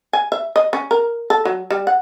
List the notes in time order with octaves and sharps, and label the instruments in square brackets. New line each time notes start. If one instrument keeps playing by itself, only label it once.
[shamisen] G#5
E5
D#5
C#4
A#4
A4
F#3
G3
F#5